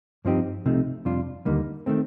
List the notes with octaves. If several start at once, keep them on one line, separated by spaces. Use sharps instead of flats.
G2 F3 C4 D#4 G4
C2 C3 F3 A3 D#4
F2 C3 G3 D4 F4
D#2 D3 G3 A#3 D#4
D#3 A3 C4